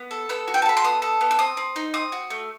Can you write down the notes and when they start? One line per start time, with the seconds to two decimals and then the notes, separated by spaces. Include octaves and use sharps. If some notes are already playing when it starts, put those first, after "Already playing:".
Already playing: B3
0.11 A4
0.29 B3 E6
0.48 F#4
0.54 G5
0.62 A5
0.66 A4 B5
0.77 C6
0.84 B3 D#6
1.02 A4
1.21 B3
1.31 E6
1.39 C4 D#6
1.57 C4
1.76 D#4
1.94 C4 D#6
2.12 F#4
2.30 A3